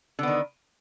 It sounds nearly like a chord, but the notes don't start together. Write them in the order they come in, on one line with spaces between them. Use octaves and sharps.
D3 B3 D#3